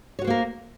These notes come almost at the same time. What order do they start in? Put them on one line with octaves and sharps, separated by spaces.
C#5 F#4 C5 A#3 A#4